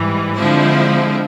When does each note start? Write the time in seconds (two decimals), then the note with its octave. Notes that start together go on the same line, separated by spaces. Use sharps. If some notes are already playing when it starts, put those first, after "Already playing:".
Already playing: G#2 E3 G3
0.35 D3 F3 G#3 C4 E4